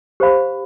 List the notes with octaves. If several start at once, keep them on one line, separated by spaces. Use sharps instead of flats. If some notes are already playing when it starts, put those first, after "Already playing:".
G4 C5 F5 B5